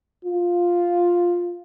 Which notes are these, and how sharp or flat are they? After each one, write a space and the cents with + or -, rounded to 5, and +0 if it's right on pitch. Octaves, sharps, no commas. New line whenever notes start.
F4 +5